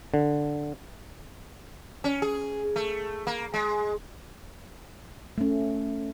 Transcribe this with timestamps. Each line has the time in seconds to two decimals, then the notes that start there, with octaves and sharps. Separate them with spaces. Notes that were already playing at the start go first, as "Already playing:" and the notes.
0.14 D3
2.04 C#4
2.22 G#4
2.76 A3
3.27 A#3
3.54 G#3
5.38 A3 C#4